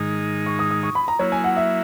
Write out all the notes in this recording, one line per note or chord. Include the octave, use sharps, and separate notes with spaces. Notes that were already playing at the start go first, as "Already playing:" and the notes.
Already playing: G#2 D#3 G#3 D#4
C#6
D#6
D#6
C#6
B5
A#5
F#3 A#3 E4 C#5
G#5
F#5
E5